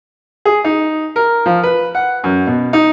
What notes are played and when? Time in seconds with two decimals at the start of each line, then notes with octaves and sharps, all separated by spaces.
0.45 G#4
0.64 D#4
1.16 A#4
1.46 F3
1.63 B4
1.95 F#5
2.24 F#2
2.47 B2
2.73 D#4